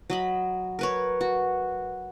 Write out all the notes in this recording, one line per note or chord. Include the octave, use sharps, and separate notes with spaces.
F#3 D#5 B5
A#4 B4 C#5
F#4